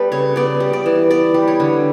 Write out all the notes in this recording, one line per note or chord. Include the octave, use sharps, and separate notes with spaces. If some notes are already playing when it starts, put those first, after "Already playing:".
Already playing: G3 B3 A4 B4
C#3 C#5
B3 D5
G3
D5
E3
B3 D5
G3
C#5
D3